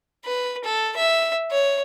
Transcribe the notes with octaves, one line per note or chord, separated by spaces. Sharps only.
B4
A4
E5
C#5